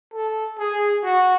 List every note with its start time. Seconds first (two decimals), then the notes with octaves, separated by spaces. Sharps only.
0.14 A4
0.58 G#4
1.03 F#4